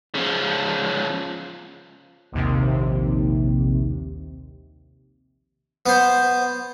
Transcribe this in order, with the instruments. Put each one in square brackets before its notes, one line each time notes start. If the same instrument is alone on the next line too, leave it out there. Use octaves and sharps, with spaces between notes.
[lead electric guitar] C#3 F3
[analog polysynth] A#1 D#2 C3
[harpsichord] B3 C5